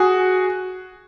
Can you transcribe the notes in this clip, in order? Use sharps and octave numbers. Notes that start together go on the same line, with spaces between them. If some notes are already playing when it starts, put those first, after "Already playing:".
Already playing: F#4 G#4